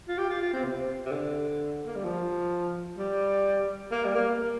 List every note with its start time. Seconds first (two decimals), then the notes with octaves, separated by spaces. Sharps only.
0.08 F4
0.18 G4
0.30 F4
0.41 F4
0.53 C4
0.64 C3
1.05 C3
1.12 D3
1.86 A#3
1.95 G3
2.05 F3
2.98 G3
3.91 A#3
4.04 G3
4.15 A#3
4.38 A#3